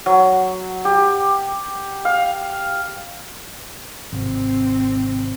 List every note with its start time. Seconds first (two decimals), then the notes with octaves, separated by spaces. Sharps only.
0.06 F#3
0.85 G4
2.05 F5
4.12 G#1 C3 C4